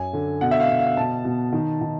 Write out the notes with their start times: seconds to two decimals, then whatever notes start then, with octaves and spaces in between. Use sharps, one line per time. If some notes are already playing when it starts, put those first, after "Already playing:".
Already playing: F#2 G#5
0.13 D3
0.41 B2 F#5
0.51 E5
0.60 F5
0.69 B2
0.79 F5
0.97 B2 A5
1.25 B2
1.52 D#3
1.81 D#3